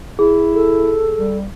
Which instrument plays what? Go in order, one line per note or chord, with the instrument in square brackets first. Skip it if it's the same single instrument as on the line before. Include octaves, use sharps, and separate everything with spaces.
[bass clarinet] E4 [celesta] G#4
[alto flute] A4
[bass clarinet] G3